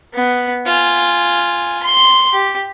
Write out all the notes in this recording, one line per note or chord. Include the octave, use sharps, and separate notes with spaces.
B3
F4 G#5
C6
G4